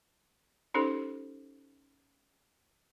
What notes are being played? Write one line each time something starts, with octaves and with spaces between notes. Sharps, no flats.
C#4 D#4 G4 A4 C5